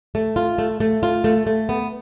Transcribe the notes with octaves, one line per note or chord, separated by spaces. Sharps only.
A3
F4
A3
A3
F4
A3
A3
B3